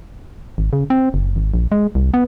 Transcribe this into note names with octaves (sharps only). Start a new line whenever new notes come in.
G#1
C#3
C4
F#1
G#1
A#1
G#3
C2
B3